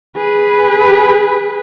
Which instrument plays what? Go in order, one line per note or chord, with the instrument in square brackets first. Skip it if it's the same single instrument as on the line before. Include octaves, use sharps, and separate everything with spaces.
[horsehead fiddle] G#4 B4